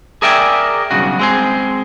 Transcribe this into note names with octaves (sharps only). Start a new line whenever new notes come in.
G#4 A#4 D5 E5 G5 G#5
B1 G2 C#3 F#4
G#3 C4 G#4